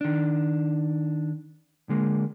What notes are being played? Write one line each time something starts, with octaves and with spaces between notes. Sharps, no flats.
D#3 D4
D3 G#3 A#3